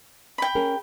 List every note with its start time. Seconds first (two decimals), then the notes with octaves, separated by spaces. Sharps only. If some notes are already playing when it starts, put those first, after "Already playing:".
0.38 G5 B5
0.55 C#4 G#4 A#4